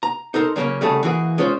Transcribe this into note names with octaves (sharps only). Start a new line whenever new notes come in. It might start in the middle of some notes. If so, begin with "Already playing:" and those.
A#5
D#4 A4 A#4 C5
C#3 F#3 G#3 A#3 C#4
C2 C#3 A3 F#4 G#4 A4
E3 A#3 F#4 G#4
G#3 C#4 F4 C5